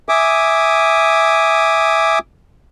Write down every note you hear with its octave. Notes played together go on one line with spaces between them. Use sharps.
E5 G#5 D6 D#6